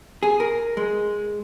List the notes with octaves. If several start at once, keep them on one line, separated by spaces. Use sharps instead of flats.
G#4
A#4
G#3